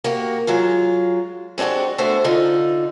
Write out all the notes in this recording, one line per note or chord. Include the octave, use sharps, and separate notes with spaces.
A#3 F#4 G4
F#3 G#3 F4
G#3 C4 D4 F#4 G4
D3 A3 B3 F#4 C5
D3 D#4 F4